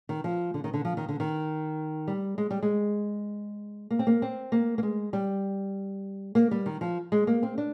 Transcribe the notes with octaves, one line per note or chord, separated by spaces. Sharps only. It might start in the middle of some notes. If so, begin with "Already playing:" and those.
D#3
F3
D3
D#3
D3
F3
D#3
D3
D#3
G3
G#3
G3
G#3
A#3
C4
A#3
C4
A#3
A#3
G#3
G3
A#3
G3
D#3
F3
G#3
A#3
C4
D4